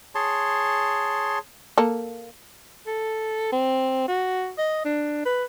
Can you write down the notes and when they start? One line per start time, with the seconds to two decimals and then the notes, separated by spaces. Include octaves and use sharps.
0.15 G#4 C#5 A5 C6
1.78 A#3 A4
2.87 A4
3.52 C4
4.08 F#4
4.58 D#5
4.85 D4
5.26 B4